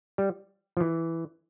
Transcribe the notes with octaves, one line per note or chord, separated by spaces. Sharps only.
G3
F3
E3